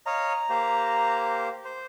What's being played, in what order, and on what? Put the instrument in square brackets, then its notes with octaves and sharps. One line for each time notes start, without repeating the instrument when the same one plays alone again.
[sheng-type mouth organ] C#5 D#5 F5 [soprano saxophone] A#5
[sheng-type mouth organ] A#3 G4 C5
C5